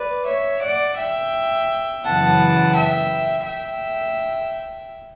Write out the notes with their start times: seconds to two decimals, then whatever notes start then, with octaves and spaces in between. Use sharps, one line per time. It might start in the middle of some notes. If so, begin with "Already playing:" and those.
Already playing: B4 D5
0.26 C#5 E5
0.62 D5 F#5
0.98 E5 G5
2.03 F#2 C#3 E3 B3 F#5 A5
2.75 E5 G5
3.46 E5 G5